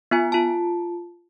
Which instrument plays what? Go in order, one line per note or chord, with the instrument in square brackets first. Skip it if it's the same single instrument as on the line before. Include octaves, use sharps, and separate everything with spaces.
[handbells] B3 F4 G#5
F4 A5